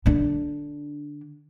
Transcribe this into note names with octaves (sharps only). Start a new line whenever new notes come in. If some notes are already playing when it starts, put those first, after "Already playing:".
D3 D4